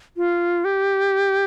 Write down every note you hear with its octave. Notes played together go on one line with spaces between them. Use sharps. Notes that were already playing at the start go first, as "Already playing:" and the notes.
F4
G4